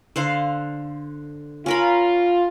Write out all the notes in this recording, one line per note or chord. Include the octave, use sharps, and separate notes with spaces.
D3 C5 F5
C#4 F4 A#4 B5